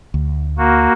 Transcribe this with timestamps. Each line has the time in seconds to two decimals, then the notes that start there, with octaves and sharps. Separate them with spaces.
0.14 D2
0.58 A#3 F#4